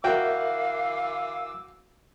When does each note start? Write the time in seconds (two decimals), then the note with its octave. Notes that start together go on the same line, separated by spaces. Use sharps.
0.04 E3 F#4 A#4 E5 F5 G5 D6 E6